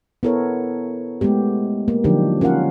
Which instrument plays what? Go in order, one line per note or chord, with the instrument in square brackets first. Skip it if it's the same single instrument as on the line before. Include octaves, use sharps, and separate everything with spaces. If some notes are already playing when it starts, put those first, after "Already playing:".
[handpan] B3 E4 A4 A#4 C#5
G#3 A3 B3 G4
A#3
D3 F3 F#3 D4 D#4 G4
C#4 F4 A#4 F5 F#5